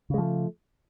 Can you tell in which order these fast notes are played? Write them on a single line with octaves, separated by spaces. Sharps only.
C#3 G#3 F3 A3